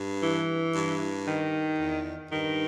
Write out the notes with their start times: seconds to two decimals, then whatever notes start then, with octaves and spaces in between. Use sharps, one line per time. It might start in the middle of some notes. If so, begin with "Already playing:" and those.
Already playing: G2
0.22 E3
0.75 G2
1.27 D#3
1.79 E2
2.31 G2 D#3